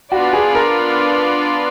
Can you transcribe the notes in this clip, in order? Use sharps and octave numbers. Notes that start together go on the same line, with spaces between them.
B3 D4 F4 F#4 B4 D5
G#4
A#4